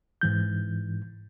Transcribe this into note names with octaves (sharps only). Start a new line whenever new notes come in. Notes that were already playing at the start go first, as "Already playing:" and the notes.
G#2 E3 G6